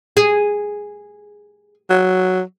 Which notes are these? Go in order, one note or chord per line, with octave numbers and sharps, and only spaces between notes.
G#4
F#3